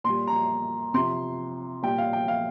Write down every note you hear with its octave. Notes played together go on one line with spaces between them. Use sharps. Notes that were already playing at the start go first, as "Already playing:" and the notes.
A#2 G3 C6
A#5
C3 F3 C6
A#2 G3 G5
F5
G5
F5